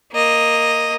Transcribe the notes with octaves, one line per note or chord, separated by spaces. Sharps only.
A#3 D#5